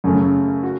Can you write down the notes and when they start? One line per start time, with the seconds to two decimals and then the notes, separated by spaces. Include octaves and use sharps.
0.04 F#2 C#3 A3 C#4
0.63 F#4